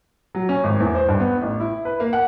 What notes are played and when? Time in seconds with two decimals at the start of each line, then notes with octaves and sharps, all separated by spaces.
0.35 F#3
0.49 C#4
0.64 G#1
0.80 E2
0.95 C5
1.08 G2
1.20 B3
1.41 A1
1.60 E4
1.85 B4
2.00 A#3
2.13 F#5